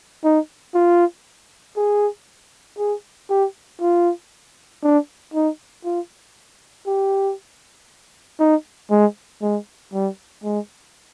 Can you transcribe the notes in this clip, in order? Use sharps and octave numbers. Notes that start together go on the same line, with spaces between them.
D#4
F4
G#4
G#4
G4
F4
D4
D#4
F4
G4
D#4
G#3
G#3
G3
G#3